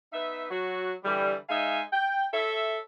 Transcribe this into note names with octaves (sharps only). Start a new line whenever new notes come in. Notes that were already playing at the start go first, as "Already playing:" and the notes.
B3 D#4 E5
F#3 F#4
D3 E3 G3
G#3 D#4 E5 F5 G#5
G5
A4 C#5 E5